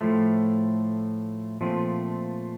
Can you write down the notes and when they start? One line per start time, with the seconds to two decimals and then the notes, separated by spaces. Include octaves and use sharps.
0.01 A2 F3 A3
1.61 A#2 F3 A3 C4 F4